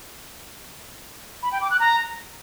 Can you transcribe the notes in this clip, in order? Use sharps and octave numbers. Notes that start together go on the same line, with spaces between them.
B5
G5
D6
F#6
A#5